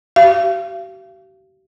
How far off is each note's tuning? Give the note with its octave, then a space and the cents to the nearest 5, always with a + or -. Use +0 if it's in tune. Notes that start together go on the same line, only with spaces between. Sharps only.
G4 -45 F5 -35